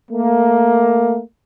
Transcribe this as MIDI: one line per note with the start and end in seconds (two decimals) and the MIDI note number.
0.11 1.20 57
0.11 1.20 58